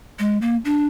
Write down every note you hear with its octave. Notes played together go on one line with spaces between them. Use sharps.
G#3
A#3
D4